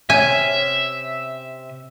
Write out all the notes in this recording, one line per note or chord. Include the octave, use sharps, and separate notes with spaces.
C3 C#4 E5 G#5